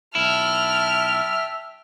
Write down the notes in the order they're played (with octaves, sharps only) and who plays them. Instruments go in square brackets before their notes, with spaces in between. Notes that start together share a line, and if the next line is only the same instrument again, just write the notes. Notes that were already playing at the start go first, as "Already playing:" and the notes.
[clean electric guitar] B1 E4 [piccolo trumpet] E5 [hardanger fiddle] G5 A5 [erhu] F6